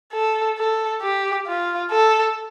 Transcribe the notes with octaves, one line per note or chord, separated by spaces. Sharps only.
A4
A4
G4
F4
A4